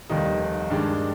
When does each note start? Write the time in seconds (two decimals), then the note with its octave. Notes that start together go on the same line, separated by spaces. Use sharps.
0.10 F1 D#2 D#3 G3 D#4
0.70 G2 D#3 G#3 D4